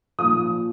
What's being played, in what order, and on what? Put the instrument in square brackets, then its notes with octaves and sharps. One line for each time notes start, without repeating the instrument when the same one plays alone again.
[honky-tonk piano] A#2 F3 D#6